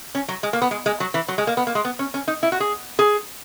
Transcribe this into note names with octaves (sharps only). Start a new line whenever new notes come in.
C#4
F#3
G#3
A#3
B3
G#3
G#3
F#3
E3
F#3
G#3
A#3
B3
A#3
G#3
B3
C#4
C#4
D#4
E4
F#4
G#4
G#4